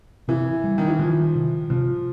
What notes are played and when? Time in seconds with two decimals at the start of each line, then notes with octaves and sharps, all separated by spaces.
0.28 C3 E3
0.64 G3
0.78 D#3
0.88 E3
0.99 D#3 F3
1.35 C3
1.70 C3 F3